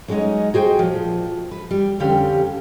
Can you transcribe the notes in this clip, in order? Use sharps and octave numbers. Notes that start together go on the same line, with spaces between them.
F#3 G#3 C#4 D#4 C#5 D#5
F#4 G#4 C5 G5
A#2 F3
B4
G3
F2 D3 G3 C#4 G4 F5